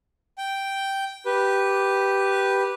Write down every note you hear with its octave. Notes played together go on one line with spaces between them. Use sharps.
G5
G4 B4